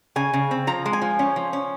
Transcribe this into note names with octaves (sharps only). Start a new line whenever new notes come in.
C#3 G#5
C#3
C4
F3 A#5
G#3
G#5
F3
C#4
F3
C#4